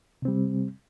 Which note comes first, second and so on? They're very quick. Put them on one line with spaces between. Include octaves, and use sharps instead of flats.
C3 C4 G3